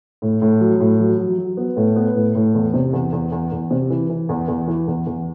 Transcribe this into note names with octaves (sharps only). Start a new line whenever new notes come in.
A2
A2
F#3
A2
F#3
F#3
F#3
B3
A2
B3
A2
A2
E2
C3
E2
E2
E2
E2
C3
E3
E3
E2
E2
E3
E2
E2